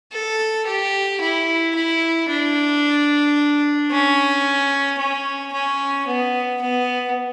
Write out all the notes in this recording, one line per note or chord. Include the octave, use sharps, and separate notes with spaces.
A4
G4
E4
E4
D4
C#4
C#4
C#4
B3
B3